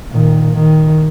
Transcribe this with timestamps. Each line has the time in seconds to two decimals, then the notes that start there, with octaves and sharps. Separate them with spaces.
0.10 A#2 D#3
0.54 D#3